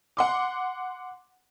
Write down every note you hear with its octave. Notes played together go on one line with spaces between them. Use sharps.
F#5 C6 D6